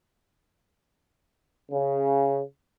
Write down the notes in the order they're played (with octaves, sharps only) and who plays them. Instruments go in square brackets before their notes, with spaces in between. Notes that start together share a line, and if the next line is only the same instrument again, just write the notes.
[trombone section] C#3